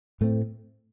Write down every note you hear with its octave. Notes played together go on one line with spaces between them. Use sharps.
A2 A3 C4